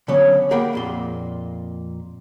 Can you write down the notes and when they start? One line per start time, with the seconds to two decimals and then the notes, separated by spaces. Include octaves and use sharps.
0.08 D3 F#3 B3 C#4
0.51 A#3 G#4 A#4 F#5 G5 B5
0.73 F2 A#2 C6